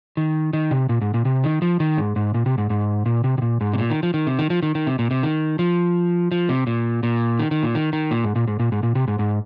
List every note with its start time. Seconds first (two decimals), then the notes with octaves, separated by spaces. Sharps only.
0.17 D#3
0.53 D#3
0.71 C3
0.89 A#2
1.01 G#2
1.14 A#2
1.25 C3
1.44 D#3
1.62 F3
1.80 D#3
1.97 G#2
2.16 G#2
2.34 A#2
2.46 C3
2.58 G#2
2.70 G#2
3.06 A#2
3.24 C3
3.38 C3
3.42 A#2
3.61 G#2
3.73 C3
3.78 A#2
3.90 D#3
4.03 F3
4.14 D#3
4.27 C3
4.39 D#3
4.50 F3
4.63 D#3
4.75 D#3
4.87 C3
4.99 A#2
5.11 C3
5.23 D#3
5.59 F3
6.32 F3
6.49 C3
6.67 A#2
7.03 A#2
7.39 D#3
7.51 D#3
7.63 A#2
7.75 D#3
7.93 D#3
8.11 A#2
8.24 G#2
8.36 A#2
8.48 G#2
8.59 A#2
8.72 G#2
8.83 A#2
8.95 C3
9.08 G#2
9.19 G#2